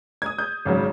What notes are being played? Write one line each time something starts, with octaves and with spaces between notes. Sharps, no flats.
D#6 G#6
G6
G#1 C#3 F#3